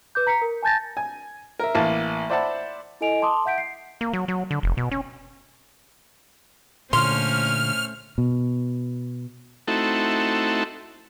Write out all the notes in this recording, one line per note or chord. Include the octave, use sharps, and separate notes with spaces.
B4 D6 G6
A#5 B6 C#7
A#4
G#5 A5 G6 A6 A#6
G#5
A#4 E5
A1 A#3 A5
C5 D5 E5 F#5 A5 B5
E4 A4 D#5 G#5 D7 F7
A5 C6 D6 D#6
E5 F#5 G6 B6 D7
C7
A#3
F#3
F#3
D3
F1
B2
C#4
A#2 D3 A3 C#4 C5 C6 F6
B2
A3 C4 D#4 E4 F#4 A4